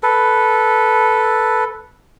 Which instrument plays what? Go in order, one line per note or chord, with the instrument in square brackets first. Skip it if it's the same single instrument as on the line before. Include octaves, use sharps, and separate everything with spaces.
[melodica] A4 B4